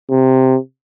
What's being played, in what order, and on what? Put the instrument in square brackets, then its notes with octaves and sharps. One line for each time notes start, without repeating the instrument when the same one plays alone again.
[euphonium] C3